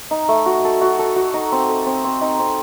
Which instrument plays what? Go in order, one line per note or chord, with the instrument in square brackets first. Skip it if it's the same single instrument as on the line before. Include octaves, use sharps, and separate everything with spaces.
[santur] D#4
A3
F#4
A4
F#4
A4
F#4
D#4
C4
A4
C4
C4
D#4
C4